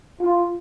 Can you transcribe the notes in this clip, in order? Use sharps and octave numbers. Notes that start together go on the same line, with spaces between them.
F4